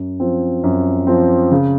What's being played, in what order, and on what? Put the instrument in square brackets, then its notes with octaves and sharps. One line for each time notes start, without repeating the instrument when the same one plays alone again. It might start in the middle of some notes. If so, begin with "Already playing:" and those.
Already playing: [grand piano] F#2
F3 C4
F#2
F3 C4
C#3